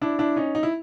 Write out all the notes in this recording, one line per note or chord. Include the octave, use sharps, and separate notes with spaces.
D4 E4
D4 E4
C#4 D#4
D#4
E4